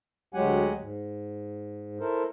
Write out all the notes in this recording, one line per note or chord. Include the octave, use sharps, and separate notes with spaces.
D2 F#3 G#3 G4 F#5 G#5
G#2
E4 A4 A#4 C5